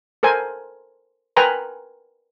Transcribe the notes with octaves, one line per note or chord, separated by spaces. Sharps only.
A4 A#4 C5 G#5
A#4 B4 G5 G#5 A#5 C6